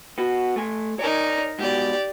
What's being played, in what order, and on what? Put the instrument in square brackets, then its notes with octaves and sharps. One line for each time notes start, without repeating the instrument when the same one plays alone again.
[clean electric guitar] B3 F#4
A3 G#5
[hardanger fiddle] D#4 A#4 [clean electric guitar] C#5 D5 G#5
[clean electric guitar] G#2 B2 [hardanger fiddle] G4 D5